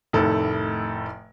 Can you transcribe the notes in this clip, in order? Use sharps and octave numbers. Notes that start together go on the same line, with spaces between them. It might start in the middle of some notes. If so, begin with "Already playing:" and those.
F1 A2 D#3 A4